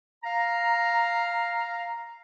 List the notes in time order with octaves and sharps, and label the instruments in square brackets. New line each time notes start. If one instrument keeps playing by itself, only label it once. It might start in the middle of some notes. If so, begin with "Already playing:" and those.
[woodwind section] F5 A#5